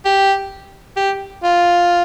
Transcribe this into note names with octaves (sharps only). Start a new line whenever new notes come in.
G4
G4
F4